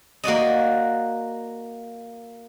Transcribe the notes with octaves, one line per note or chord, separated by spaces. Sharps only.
A#3 F#4 D5 D#5